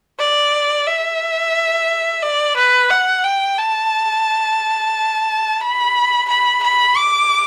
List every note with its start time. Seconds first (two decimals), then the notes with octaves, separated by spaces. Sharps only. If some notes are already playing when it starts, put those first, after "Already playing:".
0.19 D5
0.86 E5
2.22 D5
2.56 B4
2.90 F#5
3.24 G5
3.58 A5
5.61 B5
6.28 B5
6.63 B5
6.96 D6